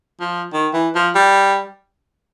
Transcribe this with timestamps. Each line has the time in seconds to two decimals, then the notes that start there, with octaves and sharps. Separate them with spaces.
0.20 F3
0.53 D#3
0.74 E3
0.95 F3
1.15 G3